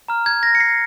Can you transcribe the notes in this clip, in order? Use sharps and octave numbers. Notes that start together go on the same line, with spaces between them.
A#5 F6
G#6
A#6
C#7
C7